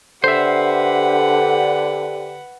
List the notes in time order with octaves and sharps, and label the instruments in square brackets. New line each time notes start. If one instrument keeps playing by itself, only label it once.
[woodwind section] D3 [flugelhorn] G4 [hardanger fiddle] B4 F#5 [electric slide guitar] C5 E5